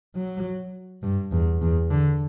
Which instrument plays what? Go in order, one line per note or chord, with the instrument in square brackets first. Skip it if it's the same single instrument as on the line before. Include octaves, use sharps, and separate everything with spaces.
[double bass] F#3
G2
E2
E2
D3